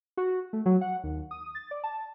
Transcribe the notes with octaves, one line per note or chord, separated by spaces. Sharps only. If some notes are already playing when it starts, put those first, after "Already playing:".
F#4
A3
F#3
F#5
D#2
D#6
A6
D5
A5